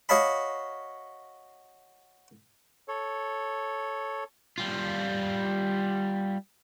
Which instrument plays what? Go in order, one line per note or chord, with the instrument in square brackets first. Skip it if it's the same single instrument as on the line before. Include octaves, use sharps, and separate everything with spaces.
[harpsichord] F#4 C#5 D#5 F5 A5 B5
[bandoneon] A4 C#5
[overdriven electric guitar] G3 F4